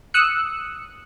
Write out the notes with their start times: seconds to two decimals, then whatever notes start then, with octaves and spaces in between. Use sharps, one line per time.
0.14 D#6 E6 F#6 C#7